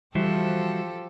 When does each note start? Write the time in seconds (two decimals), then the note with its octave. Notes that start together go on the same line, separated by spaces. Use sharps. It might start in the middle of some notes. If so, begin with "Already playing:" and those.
0.15 E3 F3 G3 F#4 G4 A4 C5 E5